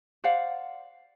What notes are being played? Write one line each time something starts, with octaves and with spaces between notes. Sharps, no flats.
C5 D5 F5 F#5